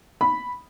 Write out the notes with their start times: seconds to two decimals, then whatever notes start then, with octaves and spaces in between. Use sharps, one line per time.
0.21 B5